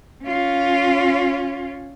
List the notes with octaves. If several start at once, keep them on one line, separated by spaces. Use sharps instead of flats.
C#4 F4